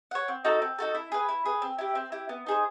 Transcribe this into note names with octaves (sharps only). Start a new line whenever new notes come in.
C#5 F#5
C4
D#4 F#4 A4
C4
D#4 F#4 A4
E4
G#4 B4
E4
G#4 B4
C4
E4 G4
C4
E4 G4
B3
D#4 G#4 C5